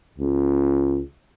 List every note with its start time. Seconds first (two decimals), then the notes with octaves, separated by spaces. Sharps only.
0.18 C#2